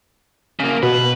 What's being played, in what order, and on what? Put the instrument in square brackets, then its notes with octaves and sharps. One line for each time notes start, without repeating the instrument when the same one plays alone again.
[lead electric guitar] C#3 A#3
[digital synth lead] B2 [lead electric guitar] B4